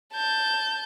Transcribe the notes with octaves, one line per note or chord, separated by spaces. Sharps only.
A5 G6